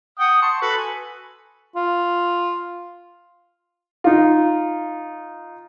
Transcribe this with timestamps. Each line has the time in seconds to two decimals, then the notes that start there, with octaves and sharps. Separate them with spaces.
0.19 F#5 G5 D#6
0.42 A5 C6 C#6
0.62 F#4 A4 B4
0.78 G#5
1.76 F4
4.04 D#4 F4